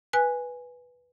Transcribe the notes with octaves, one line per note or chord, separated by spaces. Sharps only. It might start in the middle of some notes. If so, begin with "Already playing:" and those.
B4 G#5 F#6